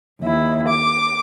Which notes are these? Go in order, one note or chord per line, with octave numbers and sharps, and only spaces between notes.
D#2 E4
D6